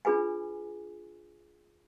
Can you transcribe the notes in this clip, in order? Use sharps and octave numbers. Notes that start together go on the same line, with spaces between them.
D4 F4 G#4 B4 G#5